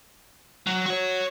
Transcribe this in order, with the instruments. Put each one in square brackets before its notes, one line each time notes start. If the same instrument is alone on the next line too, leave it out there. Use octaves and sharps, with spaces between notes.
[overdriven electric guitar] F#3
F#4 C#5